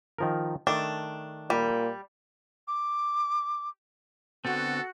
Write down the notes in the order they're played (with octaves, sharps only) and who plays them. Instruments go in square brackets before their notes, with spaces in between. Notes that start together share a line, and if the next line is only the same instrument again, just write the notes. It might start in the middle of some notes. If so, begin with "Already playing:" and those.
[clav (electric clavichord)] D#3 F3 A#4
[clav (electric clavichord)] D#3 A3 A5 [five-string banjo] D4
[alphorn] A#2 [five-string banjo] G3
[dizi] D6
[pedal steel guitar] D3 B3 C4 [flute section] F#4 [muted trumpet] A4